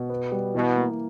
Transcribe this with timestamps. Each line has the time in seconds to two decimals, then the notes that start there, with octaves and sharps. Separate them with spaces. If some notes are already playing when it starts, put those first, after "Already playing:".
Already playing: B2
0.10 B3
0.32 G3
0.54 B2 E3
0.76 A#3